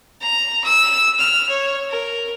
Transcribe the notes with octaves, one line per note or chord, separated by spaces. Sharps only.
A#5
E6
F6
C#5
A#4